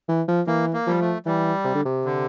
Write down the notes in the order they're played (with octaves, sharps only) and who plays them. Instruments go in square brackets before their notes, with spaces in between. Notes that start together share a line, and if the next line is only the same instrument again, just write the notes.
[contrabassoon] E3
F3
[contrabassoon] E3 [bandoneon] A#3
[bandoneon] A#3
[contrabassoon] F3 [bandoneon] G3
[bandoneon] A3
[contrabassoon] E3 [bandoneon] G3
[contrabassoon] C3
D3
C3
[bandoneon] D3